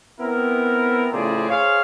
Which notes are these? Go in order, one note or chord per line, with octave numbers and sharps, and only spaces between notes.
B3 C4 E4 A#4
A2 C#3 F3 G#4 C5 D5
G#4 C5 C#5 F5